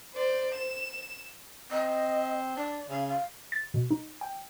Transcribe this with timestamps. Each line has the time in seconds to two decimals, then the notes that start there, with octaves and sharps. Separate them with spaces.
0.14 C5 D5
0.55 E7
1.71 C4 D#5
2.57 D4 D5
2.90 C#3 F5
3.08 F5
3.52 A6
3.74 B2
3.91 D#4
4.21 G5